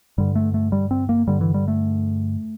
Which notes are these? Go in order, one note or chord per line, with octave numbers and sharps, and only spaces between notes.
G2 D3 G3
A3
A3
G3
C4
A#3
G2 D3 G3
E3
G3
A3